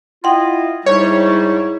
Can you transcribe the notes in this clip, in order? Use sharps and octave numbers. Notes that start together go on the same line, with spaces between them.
E4 F4 D#5 F#5 G5 C6
G#2 G3 E4 C#5